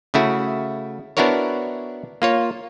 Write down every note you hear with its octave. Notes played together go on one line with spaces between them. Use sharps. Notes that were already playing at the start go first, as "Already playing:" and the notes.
C#3 A3 E4 F#4
B3 D4 E4 F#4 A#4 C#5
A#3 F4 C#5